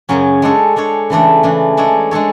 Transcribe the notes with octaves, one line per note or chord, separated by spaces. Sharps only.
F#2 C#3 F#3 C#4
G#3 D4 A4 C#5
G#3 D4 A4 C#5
C#3 E3 A3 D4
C#3 E3 A3 D4
G#3 D4 A4 C#5
G#3 D4 A4 C#5